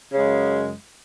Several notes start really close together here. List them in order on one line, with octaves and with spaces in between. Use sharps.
C#3 G#3 F#2